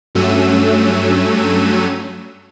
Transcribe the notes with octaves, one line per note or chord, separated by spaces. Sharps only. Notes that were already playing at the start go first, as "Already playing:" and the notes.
G2 F#3 A3 C#4 E6 D#7